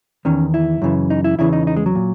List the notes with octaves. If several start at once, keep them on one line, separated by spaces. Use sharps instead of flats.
E2 D#3 C#4
E4
F#2 C#3 E3
D#4
E4
E2 C#3 E3 E4
D#4
D#4
G#3
F#3
A#2